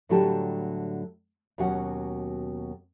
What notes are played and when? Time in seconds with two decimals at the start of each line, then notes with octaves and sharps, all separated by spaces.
0.09 A2 D3 F#3 G3 G4 A5
1.58 D#2 B2 F#3 C#4 F#5